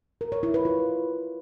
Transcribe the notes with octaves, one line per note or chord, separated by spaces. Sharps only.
A#4
C#5
E4
B4
F4